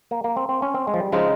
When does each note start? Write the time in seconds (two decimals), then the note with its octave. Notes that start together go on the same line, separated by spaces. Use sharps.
0.11 A#3
0.24 A#3
0.37 C4
0.49 C4
0.62 C#4
0.74 C4
0.87 G#3
0.94 F3
1.00 G3
1.12 C#3 F3 G#3 C4 D#4